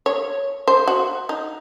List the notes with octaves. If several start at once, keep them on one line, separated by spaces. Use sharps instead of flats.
C#5
C5
F#4
D#4